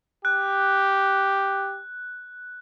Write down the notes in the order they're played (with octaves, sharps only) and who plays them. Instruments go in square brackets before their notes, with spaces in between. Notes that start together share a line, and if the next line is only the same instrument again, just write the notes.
[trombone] G4 [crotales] F#6